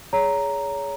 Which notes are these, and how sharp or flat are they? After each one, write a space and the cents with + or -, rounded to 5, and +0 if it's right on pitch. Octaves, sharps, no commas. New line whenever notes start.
G#4 +0 C#5 +25 A#5 +0